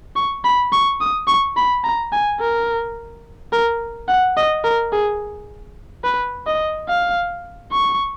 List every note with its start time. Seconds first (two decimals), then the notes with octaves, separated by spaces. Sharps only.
0.16 C#6
0.44 B5
0.72 C#6
1.01 D#6
1.28 C#6
1.57 B5
1.84 A#5
2.12 G#5
2.40 A#4
3.53 A#4
4.08 F#5
4.37 D#5
4.65 A#4
4.93 G#4
6.04 B4
6.47 D#5
6.89 F5
7.72 C#6